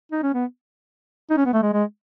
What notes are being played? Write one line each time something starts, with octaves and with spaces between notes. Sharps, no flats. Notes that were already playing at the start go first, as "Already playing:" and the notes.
D#4
C#4
B3
D#4
C#4
B3
A3
G#3
G#3